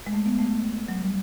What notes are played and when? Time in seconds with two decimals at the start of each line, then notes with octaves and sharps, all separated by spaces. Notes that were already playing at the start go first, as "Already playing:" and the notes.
0.07 G#3
0.13 A3
0.26 B3
0.39 A3
0.52 A3
0.88 F#3
1.02 G3